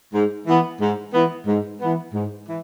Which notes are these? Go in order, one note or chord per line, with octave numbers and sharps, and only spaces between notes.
G#2
E3 B3
G#2
E3 B3
G#2
E3 B3
G#2
E3